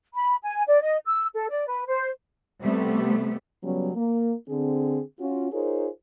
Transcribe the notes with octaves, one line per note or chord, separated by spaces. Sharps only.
B5
G#5
D5
D#5
E6
A4
D5
B4
C5
C3 G3 A3 B3
C#3 F#3 G3 B3 C#4
A#3 A#4
D3 C4 G#4
C#4 F4 F#4
D#4 F4 G#4 A#4 C5 C#5